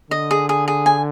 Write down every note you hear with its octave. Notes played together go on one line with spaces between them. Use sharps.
D3 D#5
G#4
G#4
G#4
G#5